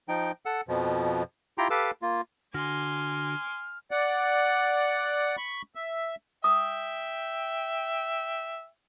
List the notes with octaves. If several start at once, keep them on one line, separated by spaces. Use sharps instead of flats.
F3 D#4 G5
A4 F#5 E6
F2 B2 F3
E4 F4 G4 G5 A#5 C6
G4 A4 B4 F5 D6 E6
A#3 F4
D3 F#4 G#5 C6 D6 F6
D5 F#5
B5 C#6
E5
E5 G5 D#6